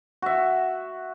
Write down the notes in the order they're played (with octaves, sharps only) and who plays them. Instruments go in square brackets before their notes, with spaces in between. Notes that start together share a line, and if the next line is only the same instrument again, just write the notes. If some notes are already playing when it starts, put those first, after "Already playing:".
[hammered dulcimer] F#4 E5